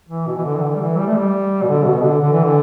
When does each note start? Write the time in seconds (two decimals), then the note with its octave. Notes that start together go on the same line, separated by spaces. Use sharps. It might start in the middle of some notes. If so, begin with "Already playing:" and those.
0.09 E3
0.27 B2
0.37 E3
0.44 D3
0.56 E3
0.62 D3
0.75 G3
0.80 E3
0.97 G3
1.07 A3
1.17 G3
1.62 B2
1.68 D3
1.86 B2
2.04 D3
2.21 D3
2.33 E3
2.45 D3